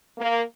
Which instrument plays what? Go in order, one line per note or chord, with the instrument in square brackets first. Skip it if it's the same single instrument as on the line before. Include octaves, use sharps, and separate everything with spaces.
[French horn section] A#3